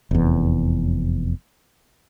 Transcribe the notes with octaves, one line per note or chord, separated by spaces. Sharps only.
F1 E2